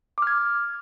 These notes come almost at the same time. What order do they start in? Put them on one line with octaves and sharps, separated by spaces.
D6 F6 G#6